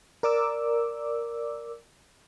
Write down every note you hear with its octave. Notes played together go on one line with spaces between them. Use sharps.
A#4 D5 D6 E6